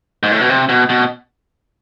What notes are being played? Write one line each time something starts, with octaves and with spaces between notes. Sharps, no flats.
G#2
A2
B2
C3
B2
B2